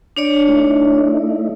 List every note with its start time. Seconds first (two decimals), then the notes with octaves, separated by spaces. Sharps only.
0.17 D4 C#5 D5
0.48 A3 D#4 E4